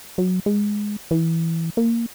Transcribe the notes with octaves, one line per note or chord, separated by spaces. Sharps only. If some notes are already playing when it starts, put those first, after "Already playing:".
F#3
G#3
E3
A#3